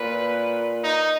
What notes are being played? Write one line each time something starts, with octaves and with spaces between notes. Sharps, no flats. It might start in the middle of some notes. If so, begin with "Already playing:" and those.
Already playing: A#2 B4
D#4